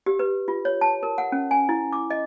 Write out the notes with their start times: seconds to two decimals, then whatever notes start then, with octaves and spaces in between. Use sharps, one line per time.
0.06 G4
0.19 B4
0.48 F4
0.65 C#5
0.81 A5
1.03 A#4
1.18 F#5
1.32 C#4
1.51 G#5
1.69 E4
1.93 D6
2.10 D#5